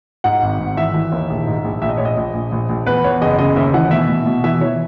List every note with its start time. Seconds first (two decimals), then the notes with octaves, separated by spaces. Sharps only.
0.24 G#2 F#5
0.42 G#1
0.59 G#1
0.77 E3 E5
0.94 E3
1.12 D#2
1.29 A#1
1.47 G#2
1.64 A#1
1.82 A#1 E5
1.89 D#5
1.97 A#1 C#5
2.05 D#5
2.17 A#1
2.34 A#1
2.52 A#1
2.69 A#1
2.86 E2 B4
3.04 E2 C#5
3.21 F#1 D#5
3.39 C#3 D#5
3.56 D#2 E5
3.74 E3 F#5
3.91 B2 E5
4.09 B2
4.26 B2
4.44 E3 E5
4.61 E3 C#5